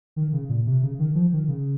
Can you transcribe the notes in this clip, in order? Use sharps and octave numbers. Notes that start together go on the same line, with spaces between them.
D#3
C#3
A#2
C3
C#3
D#3
F3
D#3
C#3